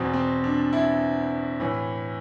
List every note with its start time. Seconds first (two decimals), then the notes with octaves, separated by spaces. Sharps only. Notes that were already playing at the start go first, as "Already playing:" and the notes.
Already playing: E2 B2 C4
0.13 C4
0.44 D4
0.73 E4
1.60 A2 E3